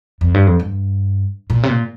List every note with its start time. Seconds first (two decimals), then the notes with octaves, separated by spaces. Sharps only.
0.21 F2
0.34 G2
0.47 F2
0.60 G2
1.50 A#2
1.63 C3
1.69 A#2